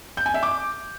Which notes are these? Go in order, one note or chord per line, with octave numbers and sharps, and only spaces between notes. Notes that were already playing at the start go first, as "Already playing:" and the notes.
G6
G#5
E5
D6